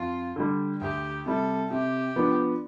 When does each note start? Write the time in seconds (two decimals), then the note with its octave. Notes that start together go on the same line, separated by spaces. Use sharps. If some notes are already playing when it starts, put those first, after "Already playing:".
Already playing: F2 F4
0.36 D3 G3
0.81 D2 G4
1.26 C3 G3 A4
1.70 C3 G4
2.16 F3 B3 D4